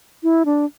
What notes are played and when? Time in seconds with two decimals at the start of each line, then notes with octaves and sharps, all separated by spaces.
0.23 E4
0.45 D4